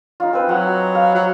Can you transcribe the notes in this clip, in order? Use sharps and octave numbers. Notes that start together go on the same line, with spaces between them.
D#4 F4
C4 B4 G#5
F#3 F#5
F5
F#3